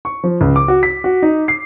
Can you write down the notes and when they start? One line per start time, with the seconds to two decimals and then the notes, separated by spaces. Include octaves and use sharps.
0.05 C#6
0.24 F3
0.41 C#2
0.56 D6
0.68 F#4
0.83 B6
1.04 F#4
1.22 D#4
1.48 C7